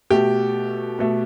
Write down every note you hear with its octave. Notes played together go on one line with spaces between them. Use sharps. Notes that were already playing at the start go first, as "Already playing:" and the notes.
B2 A3 G4
B2 A3